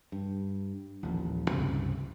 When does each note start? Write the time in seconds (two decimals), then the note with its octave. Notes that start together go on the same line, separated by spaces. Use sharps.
0.12 G2
1.03 D#1 A1 A#2 F3
1.51 C#2 G2 C3